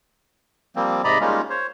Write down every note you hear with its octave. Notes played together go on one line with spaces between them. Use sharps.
F3 G3 A#3 C4
G#2 C3 D5 D#5 A#5 B5
G3 G#3 A#3 C#4 D#4 F4
C5 C#5